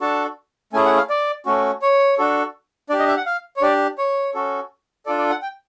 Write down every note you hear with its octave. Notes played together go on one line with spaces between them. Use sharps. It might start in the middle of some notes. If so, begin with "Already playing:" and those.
D4 F#4 A4 A5
A3 C#4 E4 G#4 G#5
F#5
F5
D5
A3 C#4 F#4
C#5
D4 F#4 A4
D4 G4 D5
D#5
E5
F#5
F5
C#5
D4 G4 D5
C#5
C#4 F#4 A4
D4 F4 A4 D5
D5
F#5
G5